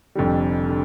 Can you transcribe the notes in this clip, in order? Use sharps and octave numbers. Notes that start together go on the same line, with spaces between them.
F1 F2 D3 G3
D3